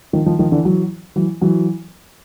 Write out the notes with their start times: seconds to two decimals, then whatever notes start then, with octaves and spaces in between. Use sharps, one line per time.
0.13 D#3 F3
0.26 D#3 F3
0.39 D#3 F3
0.52 D3 E3
0.65 E3 F#3
1.16 E3 F#3
1.41 E3 F#3